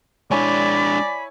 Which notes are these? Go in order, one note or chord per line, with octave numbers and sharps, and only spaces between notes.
G#3 D4 E4 C#5 D5 G#5 B5